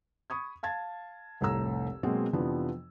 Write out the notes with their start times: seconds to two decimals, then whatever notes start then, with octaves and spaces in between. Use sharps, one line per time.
0.30 B5 C#6 D#6 G#6
0.63 F5 A5 G#6 A6
1.41 F1 C2 A2 A4 A#5 E6
2.03 B2 F#3 G#3 A#3 C4
2.33 F2 C3 E3 F3 B3 D4